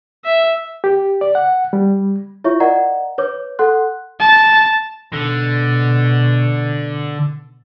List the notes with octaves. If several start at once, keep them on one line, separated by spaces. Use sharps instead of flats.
E5
G4
D5
F#5
G3
E4 F4 C#5 E5 C#6
A#4 D5 D#5 F#5 A#5
B4 C#5 D6
A4 F#5 C6 F#6
A5
B2 D3